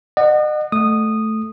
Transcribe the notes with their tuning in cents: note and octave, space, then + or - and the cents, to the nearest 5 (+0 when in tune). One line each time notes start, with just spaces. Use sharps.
D#5 -40 F#5 +0
A3 -5 D#6 -10